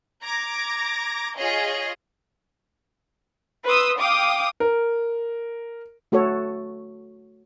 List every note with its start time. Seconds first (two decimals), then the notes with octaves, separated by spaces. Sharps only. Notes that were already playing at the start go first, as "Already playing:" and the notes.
0.23 A#5 D6 G#6 A#6
1.36 F4 G#4 C#5 D#5
3.65 B4 C6 D#6 E6
4.00 F5 G5 D6 D#6
4.60 A#4
6.12 A3 F#4 A4 C#5